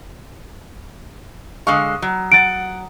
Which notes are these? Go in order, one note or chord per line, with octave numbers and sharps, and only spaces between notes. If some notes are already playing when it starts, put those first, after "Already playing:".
D3 G#3 F5 C#6 D#6
F#3
F#5 A6 D7